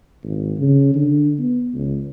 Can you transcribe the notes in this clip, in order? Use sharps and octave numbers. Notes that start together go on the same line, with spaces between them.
G#1
C#3
D3
B3
C#2